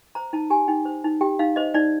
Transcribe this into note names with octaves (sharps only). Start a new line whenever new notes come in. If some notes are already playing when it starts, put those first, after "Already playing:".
C5 A#5
D#4 A5
G4 G#5
D#4 G5
C5
D#4
G4 G5
D#4 F5
C5 D#5
D#4 D5